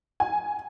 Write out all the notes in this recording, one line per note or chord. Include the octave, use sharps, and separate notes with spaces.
G#5